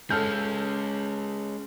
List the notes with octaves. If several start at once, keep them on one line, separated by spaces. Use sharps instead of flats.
G#3 C#4 A4 F6 G6